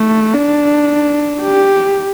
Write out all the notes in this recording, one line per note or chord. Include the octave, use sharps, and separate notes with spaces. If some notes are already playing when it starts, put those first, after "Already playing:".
Already playing: A3
D4
G4